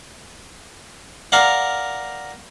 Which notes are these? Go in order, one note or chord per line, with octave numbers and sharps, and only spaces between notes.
A#4 D5 F5 F#5